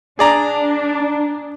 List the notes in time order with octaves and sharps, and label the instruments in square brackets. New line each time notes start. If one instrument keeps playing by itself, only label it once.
[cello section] D4 [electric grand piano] G#4 D5 A#5